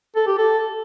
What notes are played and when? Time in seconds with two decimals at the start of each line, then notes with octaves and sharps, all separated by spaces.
0.16 A4
0.27 G4
0.38 A4